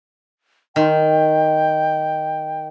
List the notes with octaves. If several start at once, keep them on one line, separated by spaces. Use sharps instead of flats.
D#3 G5